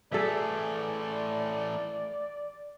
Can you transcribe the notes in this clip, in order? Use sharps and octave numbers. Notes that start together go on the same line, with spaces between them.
E3 A3 G#4 A4 D5 E5